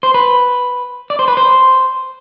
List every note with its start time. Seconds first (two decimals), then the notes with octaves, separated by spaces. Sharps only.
0.03 C5
0.14 B4
1.10 D5
1.19 C5
1.28 B4
1.37 C5